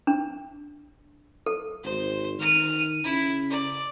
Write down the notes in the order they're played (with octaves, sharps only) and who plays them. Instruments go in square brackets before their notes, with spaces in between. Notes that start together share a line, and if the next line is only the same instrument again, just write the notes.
[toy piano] D4
A4
[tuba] G#1 [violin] C5
[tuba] D#3 [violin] F6 D#7
[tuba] C#3 [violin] E4
[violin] D5